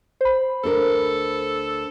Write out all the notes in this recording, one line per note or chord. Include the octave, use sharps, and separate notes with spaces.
C5 B5
D2 D4 A4 A#4